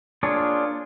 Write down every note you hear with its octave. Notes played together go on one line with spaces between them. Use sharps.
A#3 D4 F4 G#4 C#5